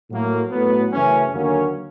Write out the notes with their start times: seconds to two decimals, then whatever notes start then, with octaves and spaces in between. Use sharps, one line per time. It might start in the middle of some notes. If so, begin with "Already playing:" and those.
0.11 A2 F#3 A#3
0.51 A2 F#3 B3
0.92 F#2 C#3 E3 A3 C#4
1.33 D#2 D3 F#3 A#3 C#4